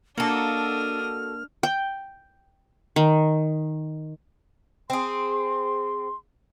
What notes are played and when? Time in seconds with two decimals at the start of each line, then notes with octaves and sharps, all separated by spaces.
0.18 A#3 D4 F#4 A4 D#5 F6
1.63 G5
2.96 D#3
4.90 C4 G#4 C6